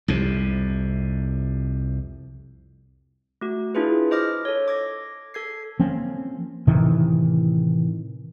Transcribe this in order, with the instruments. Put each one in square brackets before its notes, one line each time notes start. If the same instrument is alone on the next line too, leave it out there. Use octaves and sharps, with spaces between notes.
[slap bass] C2 F2 C3
[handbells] A3 F#4
D4 E4 F4 G#4 B4
C5 D#5 D6 F6 A#6
A4 C#5
D6 G#6 A#6
A4 G#6 C7
[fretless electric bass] F3 A#3 C4 C#4
A2 C3 D#3 E3